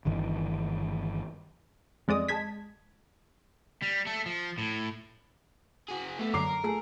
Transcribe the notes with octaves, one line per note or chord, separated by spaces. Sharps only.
G1 G2 D#3 E3
F2 G#3 D5 D#6
G#3 A5 G#6 B6
G3
A3 A4
F3
A2
F#4 G#4
A3 B3
F#2 D3 F#3 A#4 D6 C7
A3 G#4